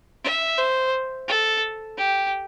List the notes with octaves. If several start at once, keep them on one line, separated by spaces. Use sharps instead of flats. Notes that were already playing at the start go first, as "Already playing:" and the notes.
E5
C5
A4
G4